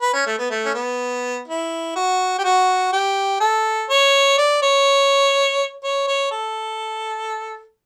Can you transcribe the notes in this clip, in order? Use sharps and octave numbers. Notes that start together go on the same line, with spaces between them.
B4
C#4
A3
B3
A3
C#4
B3
E4
F#4
G4
F#4
G4
A4
C#5
D5
C#5
C#5
C#5
A4